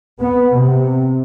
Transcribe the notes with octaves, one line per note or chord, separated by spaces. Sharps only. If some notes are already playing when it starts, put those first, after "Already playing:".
B3
C3